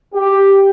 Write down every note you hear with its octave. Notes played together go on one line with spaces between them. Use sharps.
G4